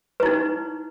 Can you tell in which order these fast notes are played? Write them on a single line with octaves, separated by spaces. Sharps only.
B4 E4 D#4